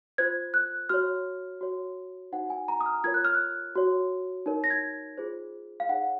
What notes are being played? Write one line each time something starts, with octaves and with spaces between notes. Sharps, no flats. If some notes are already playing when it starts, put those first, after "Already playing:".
F4 C5 G#6
F#6
F#4 C#5 F6
F#4 C#5
D#4 F#4 C5 F#5
G#5
A#5
D#6
F6
F4 A#4 C#5 G#6
F#6
F6
F#6
F#4 C#5
D#4 A#4 C#5
A#6
G#6
F4 G#4 C5
F5
D#4 G#4 C#5 F#5